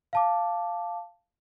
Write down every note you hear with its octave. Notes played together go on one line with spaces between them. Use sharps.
F5 A5 D6